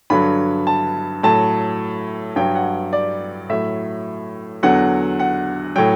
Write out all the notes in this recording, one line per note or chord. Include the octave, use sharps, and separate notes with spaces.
G2 D3 F#3 B5
A5
A2 F#3 A5
G2 F#3 G5
F#5
D5
A2 F#3 E5
E2 D3 F#3 F#5
F#5
A2 F#3 G5